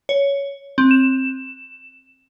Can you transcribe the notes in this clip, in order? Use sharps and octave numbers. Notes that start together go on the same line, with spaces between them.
C#5
C4
E7